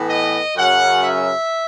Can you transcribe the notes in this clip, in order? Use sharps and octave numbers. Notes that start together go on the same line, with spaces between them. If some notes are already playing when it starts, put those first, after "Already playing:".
Already playing: A2 E3 B3
D#5
F#2 C#3 F#3 C#4 F#5
E5